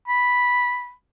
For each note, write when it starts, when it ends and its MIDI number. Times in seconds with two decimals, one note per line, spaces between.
0.08 0.92 83